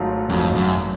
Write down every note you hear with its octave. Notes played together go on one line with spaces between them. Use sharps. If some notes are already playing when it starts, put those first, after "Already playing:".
Already playing: G#1 G#2 F#3 A3 F4
G#1 F2 G#2 F#3 A3 F4
F#2